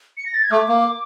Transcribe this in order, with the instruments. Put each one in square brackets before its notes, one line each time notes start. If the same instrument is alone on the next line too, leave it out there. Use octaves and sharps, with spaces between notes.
[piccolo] C#7
A#6
A6
G#6
[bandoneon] A3 [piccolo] D6
[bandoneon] A#3